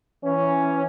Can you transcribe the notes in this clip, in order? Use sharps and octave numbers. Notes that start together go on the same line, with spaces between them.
E3 C#4